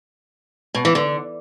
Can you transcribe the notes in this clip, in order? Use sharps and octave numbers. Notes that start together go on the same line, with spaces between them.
B2
E3
D3